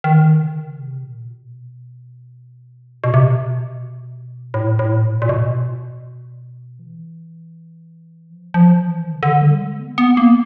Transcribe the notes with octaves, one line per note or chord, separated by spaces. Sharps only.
D#3
C#3
C3
A#2
B2
B2
C3
B2
A2
A2
A#2
A#2
B2
E3
F3
F3
E3
D#3
C#3
D3
G3
G#3
B3
B3
A#3